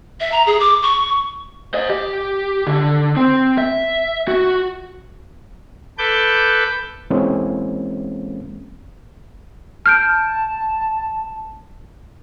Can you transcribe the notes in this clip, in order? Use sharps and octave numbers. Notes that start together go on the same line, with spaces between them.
E5
A#5
G#4
D6
C#6
C5 D#5
G4
D3
C4
E5
F#4
A4 B4 D6 G6
E3 G#3 A#3 C4 C#4
A5 F6 G6 D7